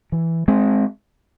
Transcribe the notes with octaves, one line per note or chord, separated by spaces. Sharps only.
E3
G#3 C4